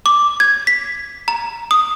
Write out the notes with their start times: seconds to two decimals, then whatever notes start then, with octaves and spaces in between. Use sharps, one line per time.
0.06 D6
0.40 G#6
0.67 B6
1.28 A#5
1.71 D#6